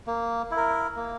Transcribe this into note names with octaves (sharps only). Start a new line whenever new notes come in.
A#3
E4
A#4
A#3